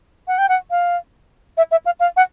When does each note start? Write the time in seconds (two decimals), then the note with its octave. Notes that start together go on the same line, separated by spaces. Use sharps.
0.28 F#5
0.38 G5
0.49 F#5
0.71 F5
1.57 E5
1.71 E5
1.86 F5
2.00 F5
2.17 F#5